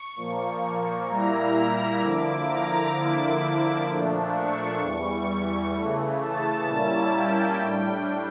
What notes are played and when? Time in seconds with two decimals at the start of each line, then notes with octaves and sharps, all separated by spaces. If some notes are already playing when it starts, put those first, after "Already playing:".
Already playing: C#6
0.16 A#2 F3 A#3
1.08 A#2 G3 A#3 E4 A#5
2.01 D3 F3 A#3 E4 D6
2.48 A#5
2.94 D3 F3 A#3 E4 D6
3.87 A#2 F3 A3 D4
4.34 C#6
4.80 E2 E3 G3 C#6
5.73 C#3 E3 A3
6.20 A5
6.66 A#2 G3 A#3 C#4 E4
7.12 G5
7.59 A2 G3 D4